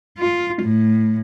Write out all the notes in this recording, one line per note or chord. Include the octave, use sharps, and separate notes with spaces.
F4
A2